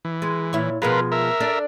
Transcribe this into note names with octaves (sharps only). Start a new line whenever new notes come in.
E3
G#3
A#2 E4 C#5
B2 F3 G#3 F4 A#4 B4
A#4 E5
D4 A4 D5